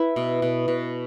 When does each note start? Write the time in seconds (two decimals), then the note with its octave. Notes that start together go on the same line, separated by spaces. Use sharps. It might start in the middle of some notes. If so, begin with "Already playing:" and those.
Already playing: E4 B4
0.16 B2
0.42 B2
0.68 B2